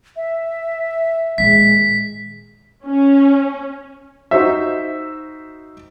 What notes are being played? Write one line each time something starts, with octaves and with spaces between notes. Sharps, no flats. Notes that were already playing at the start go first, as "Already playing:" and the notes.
E5
A#2 D#3 G#3 B6
C#4
D#4 F#4 C5 E5